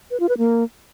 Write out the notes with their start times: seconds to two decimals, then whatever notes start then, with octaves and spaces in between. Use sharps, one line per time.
0.11 B4
0.20 F4
0.29 B4
0.38 A#3